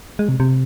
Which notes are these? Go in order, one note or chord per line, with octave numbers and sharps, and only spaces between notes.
G#3
C3
C3